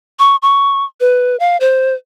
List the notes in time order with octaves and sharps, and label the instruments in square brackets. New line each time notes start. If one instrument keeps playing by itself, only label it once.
[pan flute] C#6
C#6
B4
F5
C5